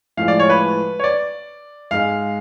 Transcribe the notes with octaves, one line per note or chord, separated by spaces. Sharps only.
A2 F3 G#3 F5
D5
C#5
B4
C#5
D5
G#2 G#3 F5